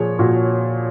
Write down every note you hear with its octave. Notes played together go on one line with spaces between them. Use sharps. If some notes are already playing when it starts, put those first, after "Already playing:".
Already playing: A#2 F3 G#4 C#5
A#2 F#4